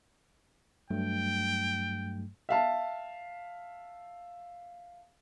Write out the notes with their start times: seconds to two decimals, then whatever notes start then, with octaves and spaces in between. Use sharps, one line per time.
0.90 G2 F#3 A3 G5
2.49 E5 F5 A5